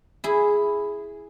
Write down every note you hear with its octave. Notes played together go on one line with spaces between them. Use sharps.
E4 G#4